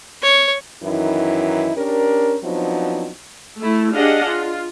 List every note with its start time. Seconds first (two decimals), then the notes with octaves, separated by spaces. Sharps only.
0.23 C#5
0.83 F#2 D#3 E3 D#4 E4
1.76 C#4 D4 G4 A#4
2.43 F3 F#3 B3 C4 D4 D#4
3.61 A3 E4
3.95 D4 G4 G#4 D#5 F5 F#5
4.28 F4